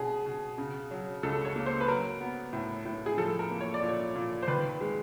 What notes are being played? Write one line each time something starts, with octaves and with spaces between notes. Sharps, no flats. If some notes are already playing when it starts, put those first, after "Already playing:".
Already playing: B2 C#4 G#4
B2
C#3
F#3
C#2 A4
C#5
A#3
C5
B4
F#3 A#4
B3
A2
A2
G#4
F3 A4
A#4
A#3
C#5
D5
A#2
C#5
A#2
C5
D#3 B4
B4
G#3